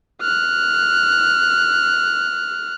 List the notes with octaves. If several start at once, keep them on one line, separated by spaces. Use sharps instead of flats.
F6 F#6